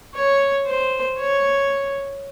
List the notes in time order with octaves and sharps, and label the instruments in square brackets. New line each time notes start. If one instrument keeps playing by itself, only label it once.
[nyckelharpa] C#5
C5
C#5